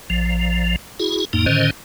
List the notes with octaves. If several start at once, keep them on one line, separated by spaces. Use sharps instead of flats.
A#1 F3
E4 F#4 G#4
F2 A2 A#3 D#4
A2 D3 D#3 C#4 C5 D#5